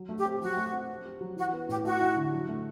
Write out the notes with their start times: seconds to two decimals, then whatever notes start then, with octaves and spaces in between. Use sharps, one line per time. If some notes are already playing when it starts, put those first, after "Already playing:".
Already playing: F#3
0.09 A3
0.18 G4
0.25 C4
0.41 F#3 F#4
0.57 A3
0.73 C4
0.90 C4
1.05 G4
1.21 F#3
1.36 E3 F#4
1.53 B3
1.69 A2 G4
1.85 A3 F#4
2.01 E4
2.16 D3
2.32 F#3
2.49 A3